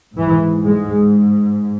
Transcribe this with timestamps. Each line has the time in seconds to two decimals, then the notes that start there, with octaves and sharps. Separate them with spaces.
0.17 G#2 E3
0.63 G#3